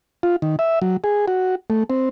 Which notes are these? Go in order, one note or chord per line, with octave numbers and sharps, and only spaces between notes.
F4
D#3
E5
F#3
G#4
F#4
A3
C4